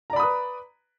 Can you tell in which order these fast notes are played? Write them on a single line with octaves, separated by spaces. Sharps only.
A#5 D5 B5 D#6 B4